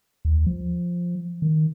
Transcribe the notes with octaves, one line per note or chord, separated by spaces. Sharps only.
D#2
F3
D#3